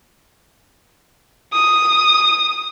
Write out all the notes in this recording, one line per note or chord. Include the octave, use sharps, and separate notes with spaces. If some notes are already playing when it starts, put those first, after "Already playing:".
D#6